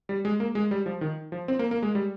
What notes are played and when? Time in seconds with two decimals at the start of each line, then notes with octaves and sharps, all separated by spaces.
0.09 G3
0.25 G#3
0.40 A#3
0.55 G#3
0.71 G3
0.86 F3
1.01 D#3
1.32 F3
1.48 C4
1.59 A#3
1.71 A#3
1.83 G#3
1.95 G3